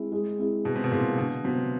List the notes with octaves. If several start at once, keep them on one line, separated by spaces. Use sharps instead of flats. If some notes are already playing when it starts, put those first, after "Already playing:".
Already playing: G#3 C4 E4 G#4
G#3
C4 E4 G#4
B2 G#3
C3
B2
A#2 C4 E4 G#4
B2 D3
C3 F#3 B3